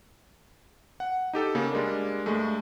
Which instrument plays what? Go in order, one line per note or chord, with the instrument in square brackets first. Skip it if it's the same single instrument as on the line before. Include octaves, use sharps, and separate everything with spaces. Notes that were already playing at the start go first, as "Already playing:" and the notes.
[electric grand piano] F#5
D#4 G4 A4
C#3 A#3
G3 G#3 A#3 D4
G2 G#3 A3